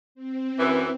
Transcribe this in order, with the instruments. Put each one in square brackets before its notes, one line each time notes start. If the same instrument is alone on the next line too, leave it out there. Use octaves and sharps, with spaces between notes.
[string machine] C4
[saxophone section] F#2 E3